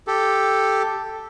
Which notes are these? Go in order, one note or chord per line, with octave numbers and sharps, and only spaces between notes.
G4 A4